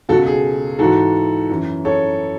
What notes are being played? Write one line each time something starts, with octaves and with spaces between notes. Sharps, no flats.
C#2 B2 F#4 A4
G#4
G#2 E3 F#4 A4
F#2 E3
A4 C#5